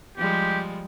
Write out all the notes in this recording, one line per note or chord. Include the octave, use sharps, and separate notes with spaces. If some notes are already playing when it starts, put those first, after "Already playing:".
F3 G3 G#3 G4